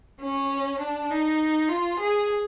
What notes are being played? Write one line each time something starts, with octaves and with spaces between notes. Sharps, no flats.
C#4
D4
D#4
F4
G#4